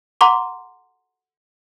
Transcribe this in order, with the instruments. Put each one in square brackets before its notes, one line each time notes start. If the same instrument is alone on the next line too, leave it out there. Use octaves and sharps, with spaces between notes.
[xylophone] F#5 A#5 C6 D6